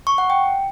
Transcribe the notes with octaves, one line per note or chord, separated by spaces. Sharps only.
C#6
F#5
G5